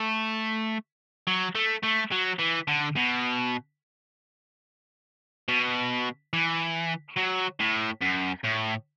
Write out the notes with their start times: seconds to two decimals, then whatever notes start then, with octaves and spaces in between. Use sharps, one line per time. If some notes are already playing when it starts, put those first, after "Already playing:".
Already playing: A3
1.27 F#3
1.55 A3
1.83 A3
2.12 F#3
2.39 E3
2.68 D3
2.96 B2
5.48 B2
6.33 E3
7.17 F#3
7.60 A2
8.02 F#2
8.44 A2